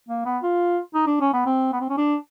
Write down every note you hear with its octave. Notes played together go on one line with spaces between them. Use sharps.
A#3
B3
F4
D#4
D4
C#4
B3
C4
B3
C4
C#4
D4